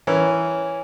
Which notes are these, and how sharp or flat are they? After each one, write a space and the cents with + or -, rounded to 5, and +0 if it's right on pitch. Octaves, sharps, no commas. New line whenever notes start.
E3 +0 C#4 +0 A#4 -5